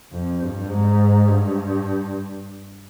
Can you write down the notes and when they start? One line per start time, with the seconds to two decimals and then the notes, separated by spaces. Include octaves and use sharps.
0.13 F2
0.42 G2
0.71 G#2
1.28 G2